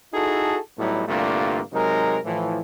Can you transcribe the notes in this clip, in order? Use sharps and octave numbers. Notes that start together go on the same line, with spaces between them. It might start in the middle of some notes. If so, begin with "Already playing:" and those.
D#4 E4 F#4 G#4 A4
A2 F#3 G3 B3 D#4 E4
C2 G2 D3 A3 A#3 F4
C3 F#3 G#3 D#4 A#4
A2 E3 F3